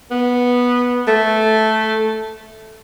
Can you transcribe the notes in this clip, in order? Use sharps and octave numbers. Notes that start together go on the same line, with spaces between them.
B3
A3